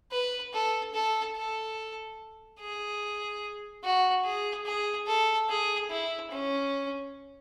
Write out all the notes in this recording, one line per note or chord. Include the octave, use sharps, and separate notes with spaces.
B4
A4
A4
A4
G#4
F#4
G#4
G#4
A4
G#4
E4
C#4